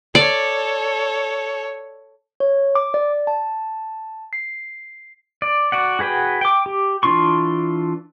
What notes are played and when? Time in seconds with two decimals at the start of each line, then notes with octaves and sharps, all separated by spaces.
0.15 A4 C#5 D5
2.40 C#5
2.75 D6
2.94 D5
3.27 A5
4.33 C7
5.42 D5
5.72 F#4 D5 F#5
5.99 F#4 G#4 B4 F#5 G5
6.41 G5 D6
6.66 G4
7.03 E3 D4 F4 C6 C#6